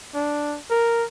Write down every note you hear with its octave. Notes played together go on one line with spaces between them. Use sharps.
D4
A#4